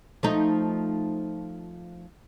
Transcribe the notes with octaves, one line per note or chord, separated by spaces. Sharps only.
F3 A3 D#4